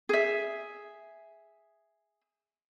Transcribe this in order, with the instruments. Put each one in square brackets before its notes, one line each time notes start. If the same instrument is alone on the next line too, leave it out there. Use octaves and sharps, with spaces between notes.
[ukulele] G#4 E5